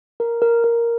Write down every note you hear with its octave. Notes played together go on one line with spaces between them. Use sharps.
A#4
A#4
A#4